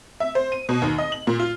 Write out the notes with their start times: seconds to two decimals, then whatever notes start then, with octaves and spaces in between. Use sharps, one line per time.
0.20 E5
0.35 C5
0.52 D#7
0.69 B2
0.82 D#2
0.98 D#5
1.12 F#7
1.27 A#2
1.39 F4